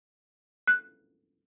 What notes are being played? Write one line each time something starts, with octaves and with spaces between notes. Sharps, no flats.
F#6